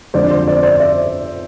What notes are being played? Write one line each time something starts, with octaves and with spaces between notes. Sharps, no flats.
F2 D3 F3 G#3 C5 D5
C5
C5 D5
C5 D5
D5 E5